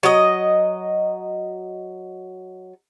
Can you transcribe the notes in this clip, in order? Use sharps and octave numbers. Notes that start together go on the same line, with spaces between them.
F#3 D#5